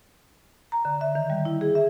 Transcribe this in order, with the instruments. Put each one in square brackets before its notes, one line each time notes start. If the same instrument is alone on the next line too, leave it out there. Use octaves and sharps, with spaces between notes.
[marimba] A#5
D3
E5
D#3
G3
E4
G#4
E5